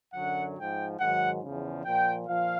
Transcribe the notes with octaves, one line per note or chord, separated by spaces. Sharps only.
F#2 D3 F#3 F#5
G#2 F3 G5
G#2 D#3 F#3 F#5
E2 C#3 F3
A#2 F3 G5
A#2 F3 F5